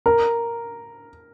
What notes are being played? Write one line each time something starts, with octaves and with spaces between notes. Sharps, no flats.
A#4